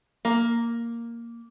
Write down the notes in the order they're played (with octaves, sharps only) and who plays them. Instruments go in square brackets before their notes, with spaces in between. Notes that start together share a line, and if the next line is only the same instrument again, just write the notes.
[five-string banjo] A#3